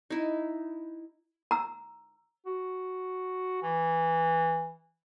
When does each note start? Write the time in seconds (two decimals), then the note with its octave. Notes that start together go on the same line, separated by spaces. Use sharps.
0.10 D#4 E4
1.51 A#5 E6
2.46 F#4
3.62 E3